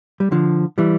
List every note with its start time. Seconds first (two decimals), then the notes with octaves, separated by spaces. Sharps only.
0.20 G3
0.32 D3 F3
0.78 E3 G3